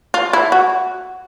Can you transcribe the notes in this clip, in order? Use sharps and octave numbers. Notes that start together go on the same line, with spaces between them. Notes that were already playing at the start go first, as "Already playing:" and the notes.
F4
E4
F#4